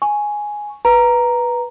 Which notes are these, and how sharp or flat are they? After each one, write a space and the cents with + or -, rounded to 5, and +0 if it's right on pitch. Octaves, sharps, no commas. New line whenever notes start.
G#5 +0 C#6 +0
B4 -10 A#5 +0